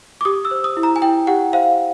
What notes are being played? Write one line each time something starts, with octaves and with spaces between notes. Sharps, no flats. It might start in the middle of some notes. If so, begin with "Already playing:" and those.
D6
G4 D#6
E6
C5
D#6
E4
A#5
G#5
E4 G5
G4 F#5
C5 F5